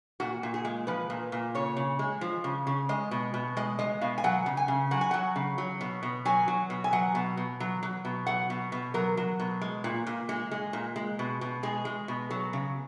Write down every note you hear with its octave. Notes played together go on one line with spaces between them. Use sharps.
A#2 F#4
A#2
G#4
G#3
F3 B4
A#2
A#2
C#3 C#5
C#3
G#3
F3
C#3
C#3
G#3 D#5
B2
B2
G#3 D#5
G#3 D#5
B2 F5
G#5
F#3 F#5
C#3
G#5
C#3
F#3 F#5
G#5
F#3 F#5
C#3
F#3
B2
B2
F#3 G#5
F#3
B2
G#5
F#3 F#5
B2
B2
F#3
F#3
B2
F#3 F#5
B2
B2
F#3 A#4
F#3
B2
G#3
A#2
A#2
G#3
G#3
A#2
G#3
B2
B2
G#3 G#4
G#3
B2
F#3
C#3